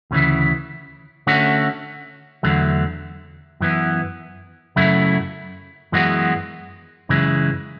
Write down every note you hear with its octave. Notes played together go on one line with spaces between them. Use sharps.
D2 C#3 E3
D3 A3 C#4 F#4
E2 D3 F#3 A3
F#2 E3 B3
F#2 C#3 F#3 A3 E4
F#2 E3 G#3 B3 F#4
F#2 C#3 E3 G#3